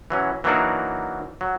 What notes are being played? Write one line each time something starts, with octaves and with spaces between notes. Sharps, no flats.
E3 F#3 C#4
E3 F#3 A#3 D4 D#4 F#4
F#3